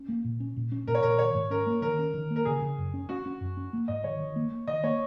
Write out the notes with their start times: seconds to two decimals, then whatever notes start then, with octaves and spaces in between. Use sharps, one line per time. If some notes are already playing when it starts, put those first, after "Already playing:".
Already playing: C#4
0.08 A#3
0.24 A#2
0.40 C#4
0.56 A#2
0.72 C#4
0.87 A#2 A#4
0.95 C#5
1.03 A#2 A#4
1.19 D#3 C#5
1.34 G#2
1.51 C#4 A#4
1.66 A#3
1.82 D#3 A#4
1.99 C#4
2.14 D#3
2.30 A#3
2.36 A#4
2.45 C#3 G#4
2.61 C#3
2.78 F#2
2.94 C#4
3.09 C#4 F#4
3.26 C#4
3.41 F#2
3.57 C#4
3.73 A#3
3.88 G#2 D#5
4.04 D#3 C#5
4.20 D#3
4.36 A#3
4.51 A#3
4.68 D#3 D#5
4.83 A#3 C#5